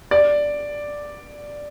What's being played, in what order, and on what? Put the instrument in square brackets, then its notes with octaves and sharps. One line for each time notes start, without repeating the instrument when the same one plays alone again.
[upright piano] D5